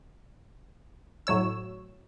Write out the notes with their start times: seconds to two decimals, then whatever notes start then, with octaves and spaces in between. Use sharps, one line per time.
1.27 A2 F#3 C#5 E6